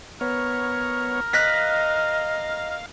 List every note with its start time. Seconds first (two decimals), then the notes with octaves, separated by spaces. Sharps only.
0.21 B3 A#4 C#5
1.33 D#5 F5 F#6 A#6 B6